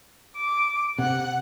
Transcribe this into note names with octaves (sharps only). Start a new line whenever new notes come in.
D6
C3 F#5